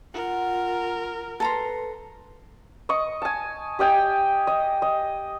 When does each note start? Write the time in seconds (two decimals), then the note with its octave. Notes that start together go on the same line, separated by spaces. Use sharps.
0.14 F4 A#4 F#5
1.40 A4 B4 A#5 C6
2.89 D#5 C#6
3.22 G#5 A5
3.79 G4 D#5 G5 G#5
4.47 D#5
4.82 D#5